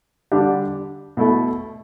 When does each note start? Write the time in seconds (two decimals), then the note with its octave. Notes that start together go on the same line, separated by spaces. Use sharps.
0.32 D3 G3 D4 G4
1.17 B2 A3 E4 A4